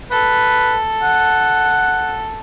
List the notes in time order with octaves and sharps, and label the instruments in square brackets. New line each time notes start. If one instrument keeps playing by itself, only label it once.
[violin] A4 [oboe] B4
[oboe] F#5